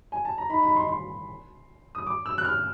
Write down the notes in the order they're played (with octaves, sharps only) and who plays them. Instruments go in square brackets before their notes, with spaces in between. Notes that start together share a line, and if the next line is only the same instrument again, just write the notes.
[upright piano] G#5
A5
A#5
[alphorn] D#4 [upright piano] B5
[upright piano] B5
C6
C6
D#6
D6
E6
F#6
F6